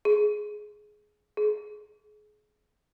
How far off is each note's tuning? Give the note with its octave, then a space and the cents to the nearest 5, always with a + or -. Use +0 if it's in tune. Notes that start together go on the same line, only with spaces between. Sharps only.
G#4 +15
G#4 +30